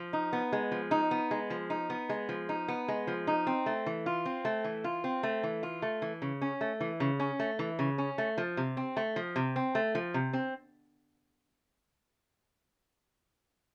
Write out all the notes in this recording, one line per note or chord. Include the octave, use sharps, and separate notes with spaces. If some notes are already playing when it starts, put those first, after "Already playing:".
Already playing: F3
D#4
B3
G#3
F3
D#4
B3
G#3
F3
D#4
B3
G#3
F3
D#4
B3
G#3
F3
D#4
C4
A3
E3
F4
C4
A3
E3
F4
C4
A3
E3
F4
A3
E3
C#3
C#4
A3
E3
C#3
C#4
A3
E3
C#3
C#4
A3
F3
C3
C4
A3
F3
C3
C4
A3
F3
C3
C4